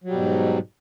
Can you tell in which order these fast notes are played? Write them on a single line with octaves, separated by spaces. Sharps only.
F#3 G3 B2 G#2